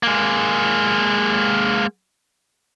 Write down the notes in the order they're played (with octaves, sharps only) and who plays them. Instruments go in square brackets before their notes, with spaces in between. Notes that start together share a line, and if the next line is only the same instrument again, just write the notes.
[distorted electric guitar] G#3 A#3